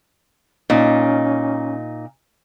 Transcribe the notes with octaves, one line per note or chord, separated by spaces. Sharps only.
A#2 C#4 D#4